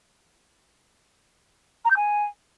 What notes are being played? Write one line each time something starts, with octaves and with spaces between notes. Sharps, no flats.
A#5
G6
G#5